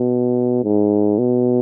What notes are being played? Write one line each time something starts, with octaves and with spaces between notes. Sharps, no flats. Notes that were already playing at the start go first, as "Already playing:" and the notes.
Already playing: B2
G#2
B2